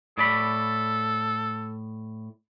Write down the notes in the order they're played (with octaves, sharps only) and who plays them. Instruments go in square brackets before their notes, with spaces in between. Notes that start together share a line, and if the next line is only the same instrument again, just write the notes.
[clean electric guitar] A2 D5 B5 [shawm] A4